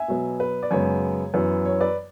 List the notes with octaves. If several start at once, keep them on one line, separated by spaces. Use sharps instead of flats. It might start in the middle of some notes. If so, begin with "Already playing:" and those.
Already playing: E5 G#5
B2 F#3 B3
B4
D5
F#2 C#3 G#3 B3 C#5
F#2 E3 B3
C#5
B4 D5